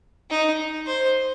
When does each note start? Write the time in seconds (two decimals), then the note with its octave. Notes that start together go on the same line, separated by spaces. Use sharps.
0.30 D#4
0.87 C5